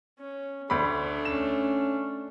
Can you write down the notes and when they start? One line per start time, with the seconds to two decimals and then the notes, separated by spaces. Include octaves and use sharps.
0.19 C#4
0.70 D2 A3 D4 B5
1.25 C#4 E7